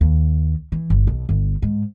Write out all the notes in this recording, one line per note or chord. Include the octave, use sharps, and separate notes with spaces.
D#2
E3
G1
B1
G1
G#2